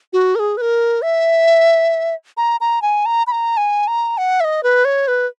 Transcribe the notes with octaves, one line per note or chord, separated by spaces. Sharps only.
F#4
A#4
G#4
B4
A#4
E5
A#5
A#5
G#5
A#5
B5
A#5
G#5
A#5
F#5
E5
D#5
B4
C#5
B4